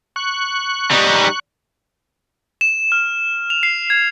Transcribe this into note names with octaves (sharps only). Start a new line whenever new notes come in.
C#6 F#6
G3 D#4
E7
F6
F7
C7
G#6